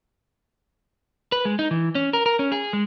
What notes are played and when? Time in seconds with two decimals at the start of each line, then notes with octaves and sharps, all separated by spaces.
1.32 B4
1.45 G#3
1.59 D#4
1.71 E3
1.95 C#4
2.13 A#4
2.26 A#4
2.39 C#4
2.52 G#4
2.73 G#3